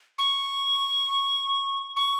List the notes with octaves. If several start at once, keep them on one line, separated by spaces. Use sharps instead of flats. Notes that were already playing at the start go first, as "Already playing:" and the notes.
C#6
C#6